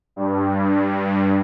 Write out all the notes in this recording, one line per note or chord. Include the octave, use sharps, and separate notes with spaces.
G2